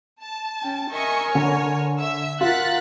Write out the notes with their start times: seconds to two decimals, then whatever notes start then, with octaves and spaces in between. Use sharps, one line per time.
0.22 A5
0.63 C#4 G5
0.92 A#4 D#5 E5 G#5 C#6
1.35 D3 C#5
2.00 E5 E6
2.41 F4 A#4 F#5 F#6 A6 B6